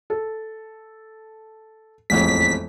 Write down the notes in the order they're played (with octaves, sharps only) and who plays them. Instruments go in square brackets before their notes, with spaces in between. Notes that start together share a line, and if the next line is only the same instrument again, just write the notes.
[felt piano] A4
[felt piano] E1 A1 F2 [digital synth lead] B6